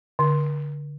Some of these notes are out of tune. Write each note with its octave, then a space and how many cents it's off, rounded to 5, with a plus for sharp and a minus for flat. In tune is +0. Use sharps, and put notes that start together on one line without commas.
D3 -15